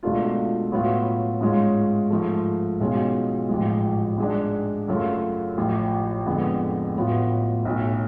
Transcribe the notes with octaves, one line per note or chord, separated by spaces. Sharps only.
C#2 B2 A3 D4 F4
A2 F#3 B3 F4
G#2 G#3 C#4 F4
G#2 F3 A3
B1 B2 G#3 C#4 F4
A1 G#2 F3 G#3
G#2 G#3 D4
F#2 C#3 F#3 A3 F4
A1 A2 F3
F2 D3 G#3 B3
A1 A2 F#3 B3 F4
B1 A2 F#3